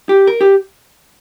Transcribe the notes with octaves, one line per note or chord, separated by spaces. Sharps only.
G4
A#4
G4